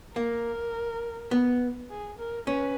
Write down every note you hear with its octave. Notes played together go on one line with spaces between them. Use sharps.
A#3 A#4
B3
G#4
A#4
C#4 B4